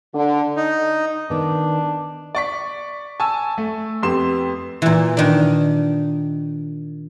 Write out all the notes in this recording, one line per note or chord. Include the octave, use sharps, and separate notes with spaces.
D3
D#4
D#3 B3 D4
D5 C#6 B6
G#5 A5 C#6 E6
A3
F2 B3 G4 C6 E7
A#2 E3
D#3 D4